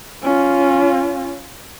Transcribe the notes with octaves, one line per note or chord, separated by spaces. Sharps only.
C#4 F4